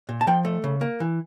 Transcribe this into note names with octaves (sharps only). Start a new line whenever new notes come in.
A#2
A5
F3 G5
A3
C#3
A#3
E3